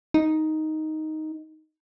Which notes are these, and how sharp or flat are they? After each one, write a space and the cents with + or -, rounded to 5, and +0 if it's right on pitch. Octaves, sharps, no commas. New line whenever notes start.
D#4 +5